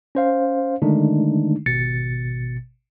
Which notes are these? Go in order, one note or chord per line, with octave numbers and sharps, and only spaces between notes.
C#4 C5 F5
D3 D#3 G#3 A3 D4 D#4
G#1 B2 A6 C#7